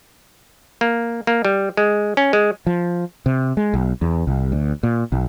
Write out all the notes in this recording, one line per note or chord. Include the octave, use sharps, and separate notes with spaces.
A#3
A#3
G3
G#3
C#4
G#3
F3
C3
G#3
B1
E2
C2
D2
A#2
B1